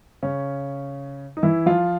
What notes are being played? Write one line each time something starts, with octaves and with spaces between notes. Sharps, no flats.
C#3 C#4
D#4
E3 E4
F3 F4